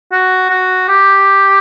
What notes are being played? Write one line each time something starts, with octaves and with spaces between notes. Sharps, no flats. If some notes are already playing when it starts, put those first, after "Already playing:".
F#4
F#4
G4